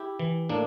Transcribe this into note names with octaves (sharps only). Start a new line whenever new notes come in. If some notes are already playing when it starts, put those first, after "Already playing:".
Already playing: E4 G4
E3
A2 A#3 D4